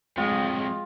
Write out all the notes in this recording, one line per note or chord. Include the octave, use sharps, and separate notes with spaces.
F2 F#3 G#3 F4 G5